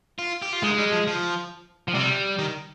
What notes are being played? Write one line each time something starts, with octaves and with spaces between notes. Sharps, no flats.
F4
G4
F4
G#3 D#4
G3
F3
F3
F3
C3 G3
D#3